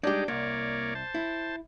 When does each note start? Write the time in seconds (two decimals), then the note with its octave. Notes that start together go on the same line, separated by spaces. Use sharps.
0.03 G3 G#3 D4 D#4 G4
0.28 C2 A#3 C#5 D5
0.95 C5 A5
1.15 E4